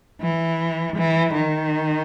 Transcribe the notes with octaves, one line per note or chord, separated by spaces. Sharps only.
E3
E3
D#3